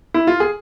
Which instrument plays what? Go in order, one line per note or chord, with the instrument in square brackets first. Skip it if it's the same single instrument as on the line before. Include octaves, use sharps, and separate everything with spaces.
[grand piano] E4
F4
G#4